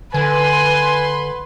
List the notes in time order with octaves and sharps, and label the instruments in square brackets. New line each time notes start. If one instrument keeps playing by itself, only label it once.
[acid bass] D3 [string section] B4 C6 [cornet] G#5